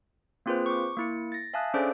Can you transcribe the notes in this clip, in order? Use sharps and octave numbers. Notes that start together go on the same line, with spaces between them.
A#3 C4 F4 G#4 B4 C5
C#6 D6
A#3 E4 C#7
A6 A#6
E5 F5 G#5 A5 D#6 F#6
C#4 D4 G#4 A4 C5 D5